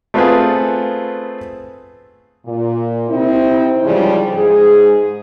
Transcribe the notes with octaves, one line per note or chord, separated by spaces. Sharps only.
A3 B3 C4 F4 G#4 B4
A#2
C3 C4 D#4 E4
G#2 C#3 E3 F3 G3
G#2 G#4